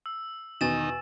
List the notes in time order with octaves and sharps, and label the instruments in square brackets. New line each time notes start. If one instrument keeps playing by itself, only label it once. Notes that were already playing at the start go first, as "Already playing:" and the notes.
[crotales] E6
[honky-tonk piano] E2 B2 [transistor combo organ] D#3 D#4 [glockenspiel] G#5 A6 E7